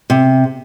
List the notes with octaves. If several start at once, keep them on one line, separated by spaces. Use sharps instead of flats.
C3